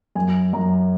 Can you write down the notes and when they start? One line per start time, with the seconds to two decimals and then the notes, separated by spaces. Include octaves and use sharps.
0.15 F#2 G#5
0.53 F#2 A#5